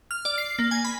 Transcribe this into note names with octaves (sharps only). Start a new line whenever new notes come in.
F6
D5
C7
A#3
G#5
B5